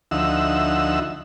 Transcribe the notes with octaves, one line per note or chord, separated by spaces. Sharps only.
D2 F3 D#4 E5 F#5 E6